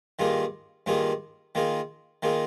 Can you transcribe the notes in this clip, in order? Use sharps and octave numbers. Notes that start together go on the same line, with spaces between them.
G2 D#3 A#3 F4 G#4
G2 D#3 A#3 F4 G#4
D#3 A#3 F4 G#4
D#3 A#3 F4 G#4